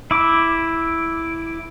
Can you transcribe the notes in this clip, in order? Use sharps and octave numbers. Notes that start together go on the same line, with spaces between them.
E4 D6